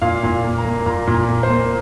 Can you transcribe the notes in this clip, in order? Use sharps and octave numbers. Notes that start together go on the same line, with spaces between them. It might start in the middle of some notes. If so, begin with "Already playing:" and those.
A#2 F5
A#2
A#3
A#5
A#3
A#2 A#5
A#2
A#5
A#3
C5
A#3